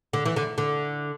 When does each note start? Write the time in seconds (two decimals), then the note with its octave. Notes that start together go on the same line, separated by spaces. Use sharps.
0.13 D3
0.26 E3
0.36 D3
0.58 D3